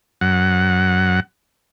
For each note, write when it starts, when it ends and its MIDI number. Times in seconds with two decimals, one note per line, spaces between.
0.21 1.20 42
0.21 1.20 78